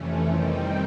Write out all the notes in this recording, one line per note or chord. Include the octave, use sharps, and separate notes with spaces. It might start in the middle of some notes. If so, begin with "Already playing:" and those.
Already playing: F2 C3 E3 A3 C#4
D#3 G3 C4 D#4 G4